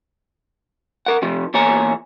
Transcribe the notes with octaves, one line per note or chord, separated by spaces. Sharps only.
A#4 F#5
C3 F3
E2 A#2 C#5 G#5 A#5